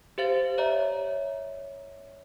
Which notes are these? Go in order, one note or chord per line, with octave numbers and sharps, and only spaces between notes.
G4 C5 F5 A6
C#5 D5 E5 A#5